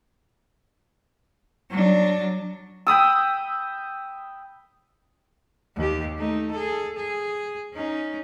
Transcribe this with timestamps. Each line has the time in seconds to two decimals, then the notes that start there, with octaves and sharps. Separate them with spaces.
1.71 F#3 D4
2.87 G5 B5 D#6 E6
5.76 D#2 G4
6.17 A3 D#4
6.51 G#4 A4
6.97 G#4
7.74 C#4 D#4